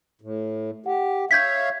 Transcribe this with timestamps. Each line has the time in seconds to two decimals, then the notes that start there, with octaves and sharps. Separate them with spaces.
0.21 A2
0.86 G4 F#5
1.31 C#5 E5 F5 G6 G#6 B6